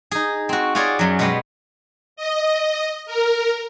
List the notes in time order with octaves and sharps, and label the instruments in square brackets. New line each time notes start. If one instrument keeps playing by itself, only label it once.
[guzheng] D#4 G#4
C4 F#4
F4 F#4 G#4 C#5 D5
F#2 F#3
B2 G#3 B3 G4
[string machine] D#5
A#4